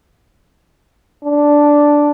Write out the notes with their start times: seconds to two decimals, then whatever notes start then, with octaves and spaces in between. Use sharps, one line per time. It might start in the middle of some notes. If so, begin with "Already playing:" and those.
1.25 D4